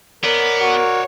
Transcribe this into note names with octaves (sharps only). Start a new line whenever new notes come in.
B3 A#4 C#5 D5
F#4